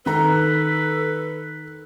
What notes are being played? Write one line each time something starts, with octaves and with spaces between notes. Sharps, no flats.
D#3 A4 B4 A#5